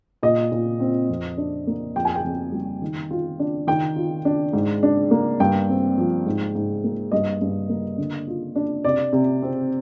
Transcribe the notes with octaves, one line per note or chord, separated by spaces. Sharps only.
A#2 D#5
A#2
C4
F2
D4
A#3
F2 G5
G#5
G5
F2
G3
D#3
F4
D4
D#3 G5
F4
D4
G#2
D4
A#3
G2 G5
C4
F3
G#2
G#2
A#3
G2 D#5
G2
A#3
D3
F4
D4
C3 D5
C3
C4